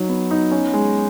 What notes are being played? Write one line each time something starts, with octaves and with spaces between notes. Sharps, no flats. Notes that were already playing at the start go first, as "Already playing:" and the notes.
Already playing: F#3 D#4
B3
D#4
C#4
G#3